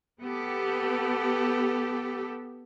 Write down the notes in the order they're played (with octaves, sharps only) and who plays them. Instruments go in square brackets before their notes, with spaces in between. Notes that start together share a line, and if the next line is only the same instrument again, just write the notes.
[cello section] B3 G4 A4